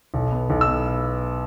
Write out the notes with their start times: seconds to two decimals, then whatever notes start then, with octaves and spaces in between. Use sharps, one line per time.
0.14 B1
0.32 B3
0.50 B1
0.61 E6
0.67 B3